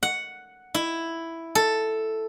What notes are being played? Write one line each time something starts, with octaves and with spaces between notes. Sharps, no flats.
F#5
E4
A4